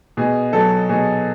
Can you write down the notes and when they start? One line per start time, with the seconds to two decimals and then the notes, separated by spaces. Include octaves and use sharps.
0.17 B2 G#4
0.53 F#3 A4
0.89 B2 G#4